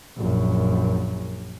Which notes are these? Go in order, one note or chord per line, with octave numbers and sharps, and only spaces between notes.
A#1 F#2